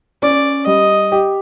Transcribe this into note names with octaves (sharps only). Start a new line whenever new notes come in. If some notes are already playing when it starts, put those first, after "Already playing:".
C#4 D5
G3 D#5
G4